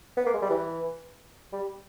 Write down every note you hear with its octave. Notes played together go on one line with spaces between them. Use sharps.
B3
A#3
G#3
G3
E3
G3